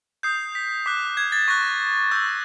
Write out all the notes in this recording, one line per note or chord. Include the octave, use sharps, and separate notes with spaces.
D#6 G6 C7
B6
D6 F#6 B6
G#6
A6
C#6 F#6 A#6
C#6 E6 G6